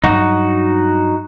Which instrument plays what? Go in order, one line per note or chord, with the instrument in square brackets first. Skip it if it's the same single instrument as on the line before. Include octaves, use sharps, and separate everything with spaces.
[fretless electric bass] G2 F#3 [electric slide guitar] D#4 F#4